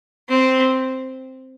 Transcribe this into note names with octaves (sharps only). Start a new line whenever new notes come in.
C4